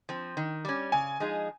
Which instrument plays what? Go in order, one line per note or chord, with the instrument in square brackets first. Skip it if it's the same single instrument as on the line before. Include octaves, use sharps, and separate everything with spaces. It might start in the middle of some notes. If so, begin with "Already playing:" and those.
[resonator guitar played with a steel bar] F3 C4
D#3
G3 C#4
[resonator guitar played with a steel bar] C#3 [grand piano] G#5
[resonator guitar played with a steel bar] F3 G#3 D#4 G#4